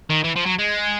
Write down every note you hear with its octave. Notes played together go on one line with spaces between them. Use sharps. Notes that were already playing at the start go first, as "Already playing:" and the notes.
D#3
E3
F3
F#3
G#3